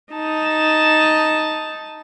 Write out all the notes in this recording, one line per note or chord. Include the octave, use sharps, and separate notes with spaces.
D#4 A5